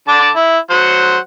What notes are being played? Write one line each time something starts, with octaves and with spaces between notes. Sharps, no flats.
D3 A5 D6
E4
F#3 C5 F#5